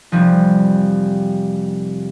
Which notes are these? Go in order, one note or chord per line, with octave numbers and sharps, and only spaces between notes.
F1 F3 G3